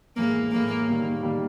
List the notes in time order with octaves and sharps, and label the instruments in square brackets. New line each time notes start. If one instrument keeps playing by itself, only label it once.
[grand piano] A2 E3 G#3 [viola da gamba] A#3
[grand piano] A2 E3 G#3 [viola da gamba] A#3
[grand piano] D#3 G3 A#3
D#3 G3 A#3